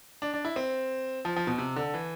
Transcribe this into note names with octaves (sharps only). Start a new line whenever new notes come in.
D4
D4
E4
C4
F3
F3
B2
C3
D3
E3